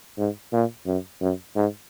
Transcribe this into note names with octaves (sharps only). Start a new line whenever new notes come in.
G#2
A#2
F#2
F#2
G#2